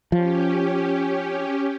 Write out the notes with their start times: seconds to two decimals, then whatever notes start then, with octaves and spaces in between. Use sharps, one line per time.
0.12 F3 C#4 G4